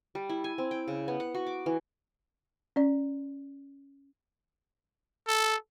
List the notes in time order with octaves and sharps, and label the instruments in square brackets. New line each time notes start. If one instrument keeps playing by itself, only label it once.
[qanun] G3
E4
G#5
C4
G5
C#3
B3
F#5
F#4
D6
E3
[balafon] C#4 D5
[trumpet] A4